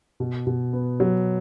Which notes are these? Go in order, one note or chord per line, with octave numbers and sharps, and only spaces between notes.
B2
B2
B3
F#3